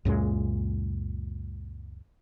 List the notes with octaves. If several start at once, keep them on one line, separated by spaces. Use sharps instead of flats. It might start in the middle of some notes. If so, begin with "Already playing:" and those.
C#2 F#2 A#2 G#3